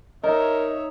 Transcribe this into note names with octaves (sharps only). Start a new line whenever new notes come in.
D#4 A#4 C#5 D#5 E5